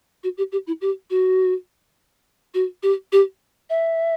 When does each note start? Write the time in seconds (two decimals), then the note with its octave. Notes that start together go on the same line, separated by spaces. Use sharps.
0.24 F#4
0.38 G4
0.52 G4
0.67 E4
0.81 G4
1.10 F#4
2.54 F#4
2.83 G4
3.12 G4
3.70 E5